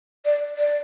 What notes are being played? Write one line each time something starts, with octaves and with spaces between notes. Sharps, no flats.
D5
D5